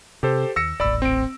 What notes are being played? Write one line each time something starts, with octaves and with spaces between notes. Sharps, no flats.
C3 G4 A4 C5
D#2 E6 A#6 C#7
D#1 A1 D5 B5 E6
C4 D7